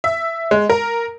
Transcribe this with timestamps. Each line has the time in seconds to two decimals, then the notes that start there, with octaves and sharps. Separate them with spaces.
0.04 E5
0.51 G#3
0.70 A#4